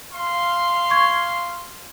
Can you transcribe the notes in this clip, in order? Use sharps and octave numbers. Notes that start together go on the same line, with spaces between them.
F5 C6
C#6 G#6